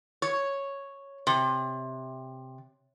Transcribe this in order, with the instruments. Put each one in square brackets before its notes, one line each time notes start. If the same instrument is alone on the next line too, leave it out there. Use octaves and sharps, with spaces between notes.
[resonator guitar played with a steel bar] C#5
C3